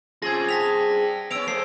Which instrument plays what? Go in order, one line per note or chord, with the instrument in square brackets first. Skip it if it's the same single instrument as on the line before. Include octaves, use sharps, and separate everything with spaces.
[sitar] C4 G#4 [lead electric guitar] C#4 F4 [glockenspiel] G#6 A#6
[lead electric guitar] G5 A5 [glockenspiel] A#6 B6 F7
[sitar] B3 C#4 [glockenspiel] E6 D7 F7
[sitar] A3 G#4 [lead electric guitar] C5 [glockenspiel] C7